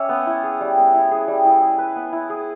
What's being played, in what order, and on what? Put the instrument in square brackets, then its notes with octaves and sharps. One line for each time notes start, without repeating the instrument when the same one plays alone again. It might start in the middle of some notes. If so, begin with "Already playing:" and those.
Already playing: [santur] C#4 G4 C#5 E5
B3
E4
G#4
G3
B3
E4
G#4
G3
E4
G#4
B4
B3
E4
G#4